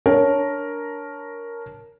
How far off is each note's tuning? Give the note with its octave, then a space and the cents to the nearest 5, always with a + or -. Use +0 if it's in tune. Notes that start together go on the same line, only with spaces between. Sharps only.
D4 -5 A#4 +0 C#5 +0